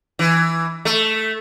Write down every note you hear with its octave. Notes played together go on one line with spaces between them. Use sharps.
E3
A3